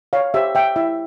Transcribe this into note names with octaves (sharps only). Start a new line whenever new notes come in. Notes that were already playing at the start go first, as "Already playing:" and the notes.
C#5 F5
G4 C5 E5
E5 G5
E4 E5